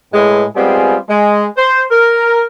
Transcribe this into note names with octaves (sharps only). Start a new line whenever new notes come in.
A2 G#3 B4
G3 G#3 B3 C4 F4 G#4
G#3
C5
A#4